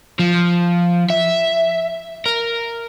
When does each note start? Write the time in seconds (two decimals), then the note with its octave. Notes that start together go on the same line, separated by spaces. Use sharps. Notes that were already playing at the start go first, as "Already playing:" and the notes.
0.19 F3
1.10 E5
2.26 A#4